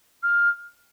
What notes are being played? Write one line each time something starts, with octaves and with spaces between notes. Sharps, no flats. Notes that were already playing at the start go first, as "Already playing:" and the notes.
F6